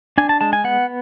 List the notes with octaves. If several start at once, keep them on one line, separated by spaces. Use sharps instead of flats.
D4 G#5
A5
G#3 A5
G#5
B3 F#5